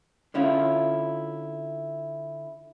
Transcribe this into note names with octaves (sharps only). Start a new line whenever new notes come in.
D3 C#4 E4 F4